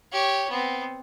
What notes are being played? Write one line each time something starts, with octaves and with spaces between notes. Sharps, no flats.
G4 C#5
B3 C4